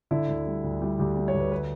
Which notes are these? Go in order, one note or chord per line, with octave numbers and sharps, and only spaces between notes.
D3 E4
D2
G3
D2
G3 E4
D2 G4
G3
C#5
D2
B4
B4